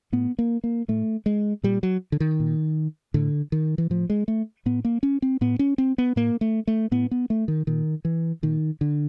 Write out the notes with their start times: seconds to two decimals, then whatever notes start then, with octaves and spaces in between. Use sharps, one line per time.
0.12 A2 B3
0.39 A#3
0.64 A#3
0.88 A2 A3
1.26 G#3
1.63 A#2 G3
1.83 F#3
2.12 D3
2.20 D#3
2.40 A#2
3.14 A2 D3
3.52 D#3
3.78 E3
3.90 A2 F3
4.10 G#3
4.28 A3
4.66 A2 B3
4.85 A#3
5.03 C#4
5.22 C4
5.41 A2 B3
5.59 C#4
5.78 C4
5.98 B3
6.16 A2 A#3
6.41 A3
6.67 A3
6.91 A2 B3
7.11 B3
7.30 A3
7.48 D#3
7.67 A#2 D#3
8.05 E3
8.43 A#2 D#3
8.81 D3